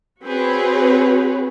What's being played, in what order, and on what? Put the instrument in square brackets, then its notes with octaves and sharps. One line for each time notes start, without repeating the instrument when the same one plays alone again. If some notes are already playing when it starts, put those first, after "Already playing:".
[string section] C4 F#4 G#4 B4 C#5